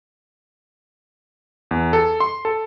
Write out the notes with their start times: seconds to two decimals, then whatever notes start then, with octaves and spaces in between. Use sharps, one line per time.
1.71 E2
1.93 A4
2.20 C6
2.45 A4